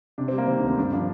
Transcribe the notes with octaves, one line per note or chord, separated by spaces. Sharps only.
C3 D4
C4
G3
A#3
D#3 C4
D2 D4
C4
G2 D4
F3 D4